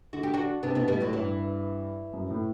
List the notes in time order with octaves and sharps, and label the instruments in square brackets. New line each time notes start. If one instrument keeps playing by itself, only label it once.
[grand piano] D3 [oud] F#4
[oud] G4
D4 F#4
[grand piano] C3 [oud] B3 D4
[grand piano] B2 [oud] B3 D4
[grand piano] A2 [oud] G3 B3
[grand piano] A2 [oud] D3 F#3
[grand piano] G2 [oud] E3
[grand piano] F#2
A2